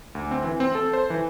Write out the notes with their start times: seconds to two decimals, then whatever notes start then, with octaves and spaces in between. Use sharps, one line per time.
0.15 D2
0.31 C4
0.44 E3
0.60 C4
0.75 A4
0.93 C5
1.10 E3